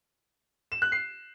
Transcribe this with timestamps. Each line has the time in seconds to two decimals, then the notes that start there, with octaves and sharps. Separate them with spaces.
0.72 E7
0.82 F#6
0.92 C7